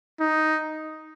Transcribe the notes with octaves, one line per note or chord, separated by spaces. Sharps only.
D#4